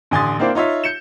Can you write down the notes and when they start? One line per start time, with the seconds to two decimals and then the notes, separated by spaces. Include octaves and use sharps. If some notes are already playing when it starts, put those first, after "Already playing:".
0.11 A1 D3 G#5 C6 D#6 A6
0.39 A#3 C4 D4 E4 C5 F5
0.55 D#4 F4 C#5 E5
0.84 G6 C#7 E7